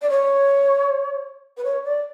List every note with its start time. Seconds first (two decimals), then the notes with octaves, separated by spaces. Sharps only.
0.02 D5
0.10 C#5
1.57 B4
1.64 C#5
1.84 D5